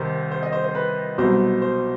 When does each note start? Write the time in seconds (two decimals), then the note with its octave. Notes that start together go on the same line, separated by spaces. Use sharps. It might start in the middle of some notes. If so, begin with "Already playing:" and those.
Already playing: C2 C3 D#3 C5
0.31 C5
0.43 D#5
0.52 C5
0.64 C5
0.75 B4
1.18 C2 B2 F#3 C5
1.62 C5